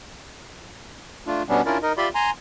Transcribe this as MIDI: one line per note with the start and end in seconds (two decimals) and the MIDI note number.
1.27 1.43 57
1.27 1.43 62
1.27 1.43 65
1.49 1.62 47
1.49 1.62 55
1.49 1.62 59
1.49 1.62 61
1.49 1.62 62
1.66 1.78 61
1.66 1.78 62
1.66 1.78 64
1.66 1.78 65
1.66 1.78 70
1.66 1.78 74
1.83 1.93 63
1.83 1.93 70
1.83 1.93 75
1.97 2.09 65
1.97 2.09 67
1.97 2.09 74
1.97 2.09 76
1.97 2.09 83
1.97 2.09 84
2.15 2.31 80
2.15 2.31 82
2.15 2.31 84